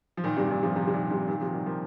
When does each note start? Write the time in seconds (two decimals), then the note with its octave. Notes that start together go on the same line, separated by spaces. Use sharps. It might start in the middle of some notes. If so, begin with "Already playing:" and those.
0.17 F3
0.24 A#2 D#3
0.37 G2 C3
0.50 A#2 D#3
0.63 C3 F3
0.76 C3 F3
0.88 C3
0.94 A#2 D#3
1.11 G2 C3
1.28 A#2 D#3
1.41 C3 F3
1.53 D#3 G3
1.66 F3 A#3